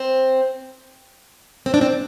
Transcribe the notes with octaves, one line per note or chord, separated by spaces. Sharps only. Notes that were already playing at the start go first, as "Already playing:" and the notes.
Already playing: C4
C4
D4
C4